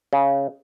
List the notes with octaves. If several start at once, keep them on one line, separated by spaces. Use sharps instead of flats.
C#3